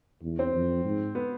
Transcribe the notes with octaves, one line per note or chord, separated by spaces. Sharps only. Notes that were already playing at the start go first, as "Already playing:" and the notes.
E2
C4
F2
G#2
B3